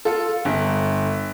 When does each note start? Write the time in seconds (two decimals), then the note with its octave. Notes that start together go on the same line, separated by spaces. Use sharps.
0.05 F4 A4
0.45 G1